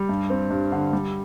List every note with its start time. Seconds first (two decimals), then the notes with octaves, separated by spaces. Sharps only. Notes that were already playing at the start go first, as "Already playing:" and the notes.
Already playing: G3
0.09 G2
0.30 C4
0.50 G2
0.72 D3
0.93 G3